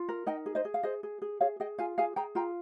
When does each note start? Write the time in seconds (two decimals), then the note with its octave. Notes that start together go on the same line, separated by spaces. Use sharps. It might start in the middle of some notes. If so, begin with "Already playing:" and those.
Already playing: F4
0.09 A#4
0.26 D#4 D#5 G5
0.46 G#4
0.55 C5 D#5
0.65 G#4
0.74 F5
0.83 G#4 C5 D#5
1.03 G#4
1.22 G#4
1.41 G#4 C#5 F5
1.60 G#4 D#5 G5
1.78 F4 F5 G#5
1.98 G#4 F5 G#5
2.16 G#4 G5 A#5
2.35 F4 G5 A#5